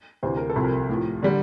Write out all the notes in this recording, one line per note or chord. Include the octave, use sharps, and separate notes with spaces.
D2 C3 E3 C5
A#4
A4
C2 C3 F3
A#4
A2 F3
D3 G3